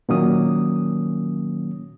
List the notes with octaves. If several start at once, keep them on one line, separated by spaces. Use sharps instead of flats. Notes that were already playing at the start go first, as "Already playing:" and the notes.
A#2 D#3 F#3 A#3 C#4 D#6